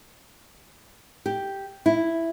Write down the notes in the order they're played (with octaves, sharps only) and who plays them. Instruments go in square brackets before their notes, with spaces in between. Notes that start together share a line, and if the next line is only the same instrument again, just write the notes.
[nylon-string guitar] G4
E4